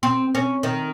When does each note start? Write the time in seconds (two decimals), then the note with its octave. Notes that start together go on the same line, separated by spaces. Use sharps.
0.03 C4
0.35 C#4
0.63 D#3